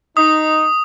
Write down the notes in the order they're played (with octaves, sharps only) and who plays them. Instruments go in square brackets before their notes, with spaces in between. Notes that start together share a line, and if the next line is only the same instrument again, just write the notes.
[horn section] D#4 [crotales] D#6